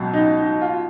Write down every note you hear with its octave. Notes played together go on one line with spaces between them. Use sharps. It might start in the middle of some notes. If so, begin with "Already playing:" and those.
Already playing: C#2 B2 F#3
D#4
D#4
F4